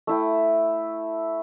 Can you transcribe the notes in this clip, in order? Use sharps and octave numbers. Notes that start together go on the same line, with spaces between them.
A3 E4 G5